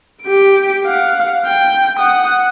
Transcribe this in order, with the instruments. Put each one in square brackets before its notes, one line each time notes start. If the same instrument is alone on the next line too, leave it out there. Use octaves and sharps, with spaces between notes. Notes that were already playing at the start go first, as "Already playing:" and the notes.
[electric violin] G4 D7
F5 F#5
G5
F#5 D#6